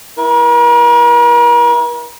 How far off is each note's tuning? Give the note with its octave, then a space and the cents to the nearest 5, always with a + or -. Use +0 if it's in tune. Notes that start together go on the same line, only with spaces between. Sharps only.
E4 +0 A#4 +45